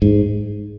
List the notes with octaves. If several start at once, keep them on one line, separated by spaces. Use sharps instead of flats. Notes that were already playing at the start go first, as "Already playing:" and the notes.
G#2